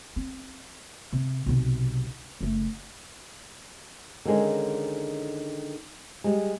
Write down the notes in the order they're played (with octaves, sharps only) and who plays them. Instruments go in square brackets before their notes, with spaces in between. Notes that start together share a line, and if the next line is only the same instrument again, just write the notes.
[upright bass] C4
C3
B1 C3
F#1 A3
[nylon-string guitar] D3 D#3 G#3 C#4
G3 G#3